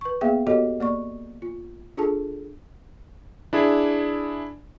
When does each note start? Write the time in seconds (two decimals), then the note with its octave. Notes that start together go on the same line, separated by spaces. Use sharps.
0.01 B4 C#6
0.21 A#3 B3 G#4 E5 F5 G5
0.47 B3 F#4 G4 A4 C#5 D#5
0.80 A#3 D5 C#6
1.42 F4
1.97 D4 F4 G#4 A4 A5
3.53 D4 E4 G#4